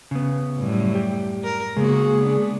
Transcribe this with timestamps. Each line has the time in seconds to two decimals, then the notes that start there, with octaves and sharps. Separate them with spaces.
0.11 C#3 B3
0.58 F#2 A2 G3
0.95 G4
1.44 A#4
1.77 C#3 G#3 A#3 B3 F#4 G#4
2.18 B3 D4